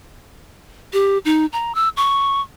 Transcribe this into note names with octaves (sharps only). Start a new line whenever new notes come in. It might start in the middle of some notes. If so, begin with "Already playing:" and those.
G4
D#4
A#5
E6
C#6